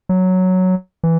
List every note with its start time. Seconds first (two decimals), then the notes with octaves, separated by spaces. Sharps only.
0.09 F#3
1.03 E3